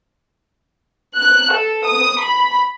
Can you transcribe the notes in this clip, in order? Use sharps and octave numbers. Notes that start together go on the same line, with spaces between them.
F#6
A4
D#6
B5